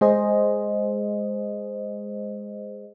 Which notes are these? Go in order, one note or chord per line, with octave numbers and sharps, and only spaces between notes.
G#3 G#4 C5 D#5